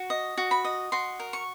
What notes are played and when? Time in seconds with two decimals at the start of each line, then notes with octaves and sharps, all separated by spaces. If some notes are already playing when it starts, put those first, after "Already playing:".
Already playing: F#4
0.10 D#5
0.38 F#4
0.51 B5
0.64 D#5
0.92 F#4 C6
1.20 A#4
1.33 C#6